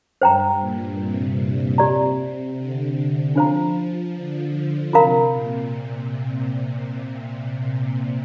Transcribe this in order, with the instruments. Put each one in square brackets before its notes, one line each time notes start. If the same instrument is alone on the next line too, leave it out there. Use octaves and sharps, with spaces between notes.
[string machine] G2 [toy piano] C5 G5 A#5
[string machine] A#2
C3
[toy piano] G4 D5 A#5
[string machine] D3
[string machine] F3 [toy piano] D4 F4 C5 F5 A#5
[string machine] D3
[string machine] C3 [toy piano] F4 A#4 F5 A#5
[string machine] A#2